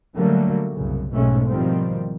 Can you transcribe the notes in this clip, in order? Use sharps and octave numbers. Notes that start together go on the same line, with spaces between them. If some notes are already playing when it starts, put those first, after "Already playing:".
D3 F#3 G3 A3 A#3
C2 F#2 C#3
B1 G#2 B2 G#3 A3 C#4
B2 D#3 F3 G3 C4